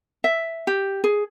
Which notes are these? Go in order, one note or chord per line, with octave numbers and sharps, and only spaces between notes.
E5
G4
G#4